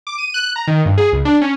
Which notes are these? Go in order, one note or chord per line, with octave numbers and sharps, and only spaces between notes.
D6
D#7
F#6
A#5
D#3
G2
G#4
C#2
D4
C#4